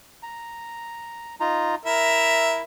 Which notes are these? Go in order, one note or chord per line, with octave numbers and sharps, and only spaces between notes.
A#5
D#4 F4 A#5
E4 A#4 E5